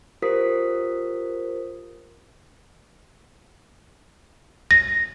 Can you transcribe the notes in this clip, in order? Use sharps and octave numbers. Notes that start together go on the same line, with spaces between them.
F4 G4 A#4 C5 D#6 B6
A#6